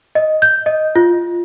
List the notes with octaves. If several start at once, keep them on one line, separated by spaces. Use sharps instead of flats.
D#5
G6
D#5
F4